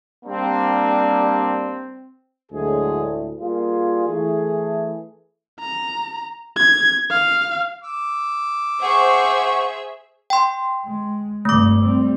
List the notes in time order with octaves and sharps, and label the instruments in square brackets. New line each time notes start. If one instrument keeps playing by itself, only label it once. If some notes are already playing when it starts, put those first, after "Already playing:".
[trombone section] G3 A#3 D4 [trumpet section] C4
[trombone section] D2 A2 [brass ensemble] F#3 G#3 G#4
[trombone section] G3 A#3 F4 [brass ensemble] G#4
[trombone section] E3 A3
[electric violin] A#5
G#6
F5
[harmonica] D6 E6
[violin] G#4 E5 [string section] C5 C#6 [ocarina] F#5
[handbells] G5 C6
[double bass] G#3
[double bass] F1 G2 [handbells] A3 D6
[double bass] G3 C4